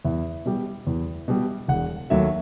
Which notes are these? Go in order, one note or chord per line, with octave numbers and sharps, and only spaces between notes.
E2 E5
B2 G3
E2
B2 G3
E1 F#5
D#2 D#3 F#3 A3 E5